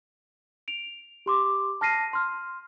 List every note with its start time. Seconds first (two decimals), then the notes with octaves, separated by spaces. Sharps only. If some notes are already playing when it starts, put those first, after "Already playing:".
0.68 D7 F7
1.26 G4 C6 D6
1.81 A5 F6 A#6 C7 D#7
2.13 C6 F6